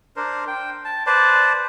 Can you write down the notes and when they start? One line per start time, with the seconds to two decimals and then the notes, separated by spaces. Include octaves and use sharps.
0.16 D4 A#4 C5
0.48 G5
0.85 A5
1.06 B4 C5 D5 A5